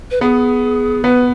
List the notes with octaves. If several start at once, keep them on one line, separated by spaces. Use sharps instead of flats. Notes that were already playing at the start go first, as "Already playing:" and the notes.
B4
B3 G#4
B3 B4